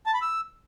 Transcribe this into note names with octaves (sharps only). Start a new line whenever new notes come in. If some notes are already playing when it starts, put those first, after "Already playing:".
A5
B5
E6